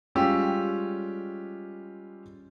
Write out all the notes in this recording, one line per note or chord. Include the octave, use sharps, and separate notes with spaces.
G3 G#3 C#4 F4 G4 E6